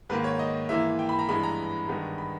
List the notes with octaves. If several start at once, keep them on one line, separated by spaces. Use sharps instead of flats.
G#2 D#3 A#3 B4
C#5
D#5
G#2 E3 A#3 E5
G5
B5
A#5
G2 E3 G#3 B3 B5
A#5
G2 D#3 G#3 B3
B5